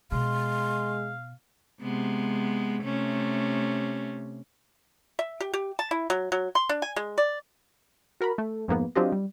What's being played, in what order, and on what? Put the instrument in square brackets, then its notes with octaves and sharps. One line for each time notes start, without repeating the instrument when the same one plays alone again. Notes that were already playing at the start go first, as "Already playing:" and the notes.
[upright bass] B2 [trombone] G#3 [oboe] F5 [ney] C6
[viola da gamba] C3 G#3 B3
C3 A3 C#4
[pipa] E5
G4
G4
A5
E4
F#3
F#3
C6
D4
G#5
G#3
D5
[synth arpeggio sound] F#4 A#4 A#5 B5
A3
F2 G#2 A#3 B3
F#3 C4 D4 F4 G4 D#5
G3